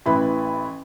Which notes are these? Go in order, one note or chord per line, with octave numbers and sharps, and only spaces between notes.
A1 E3 E4 B4 B5